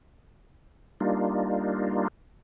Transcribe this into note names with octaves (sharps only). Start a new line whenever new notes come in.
G3 A#3 D4 D#4 F4